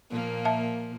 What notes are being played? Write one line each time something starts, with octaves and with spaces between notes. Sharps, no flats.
A#2 F3 A#3
E5 A5